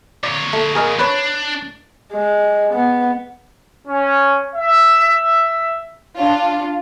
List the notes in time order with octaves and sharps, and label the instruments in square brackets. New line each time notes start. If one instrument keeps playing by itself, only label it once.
[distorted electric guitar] A#2 C#5 [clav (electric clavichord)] D5
[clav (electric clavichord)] A3
G#4 A#4 D#5
[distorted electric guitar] D4 [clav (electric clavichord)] B4 C#5
[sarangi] G#3
B3
[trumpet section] C#4
E5
[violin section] D4 F4